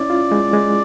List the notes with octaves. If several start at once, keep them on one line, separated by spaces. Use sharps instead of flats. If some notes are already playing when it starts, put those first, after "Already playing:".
Already playing: C#4 E4 D5
F4
G#3
G#3